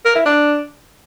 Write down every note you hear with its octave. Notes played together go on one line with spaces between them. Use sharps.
A#4
E4
D4